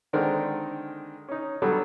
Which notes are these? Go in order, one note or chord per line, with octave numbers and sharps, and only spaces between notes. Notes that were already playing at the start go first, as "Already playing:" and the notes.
D3 D#3 G#3 C4 A#4 D5
C#4 D#4
D3 F#3 G3 B3 A4